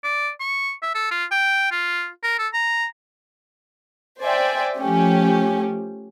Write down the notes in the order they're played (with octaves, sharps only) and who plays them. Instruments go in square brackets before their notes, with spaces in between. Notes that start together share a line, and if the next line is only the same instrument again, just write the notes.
[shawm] D5
C#6
E5
A4
F4
G5
F4
A#4
A4
A#5
[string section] C5 D5 E5 G5 G#5
F3 A3 C#4 G4